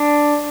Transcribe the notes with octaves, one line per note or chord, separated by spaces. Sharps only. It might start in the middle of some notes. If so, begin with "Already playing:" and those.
Already playing: D4